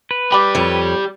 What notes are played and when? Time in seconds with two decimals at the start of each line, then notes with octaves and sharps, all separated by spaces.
0.11 B4
0.32 G3 G4 B5 D6
0.55 F2 C#5